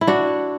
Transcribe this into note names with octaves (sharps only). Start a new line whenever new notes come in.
E4
D4 F#4